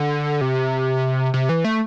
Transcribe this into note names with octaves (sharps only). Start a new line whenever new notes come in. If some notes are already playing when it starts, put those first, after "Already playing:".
Already playing: D3
C3
C3
E3
A3